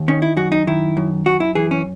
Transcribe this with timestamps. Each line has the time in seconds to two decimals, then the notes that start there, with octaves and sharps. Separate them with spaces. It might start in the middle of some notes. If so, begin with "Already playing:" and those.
Already playing: D#2
0.08 D#3 C#4
0.22 E4
0.37 F#2 F#4
0.52 D#4
0.67 D#3 E4
0.97 F#2
1.26 F#2 F#4
1.40 E4
1.55 E3 G#4
1.71 C#4